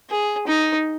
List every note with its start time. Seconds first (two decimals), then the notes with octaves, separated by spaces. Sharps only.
0.10 G#4
0.47 D#4